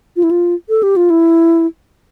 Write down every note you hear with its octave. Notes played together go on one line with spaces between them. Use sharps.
F4
E4
F4
A4
G4
F4
E4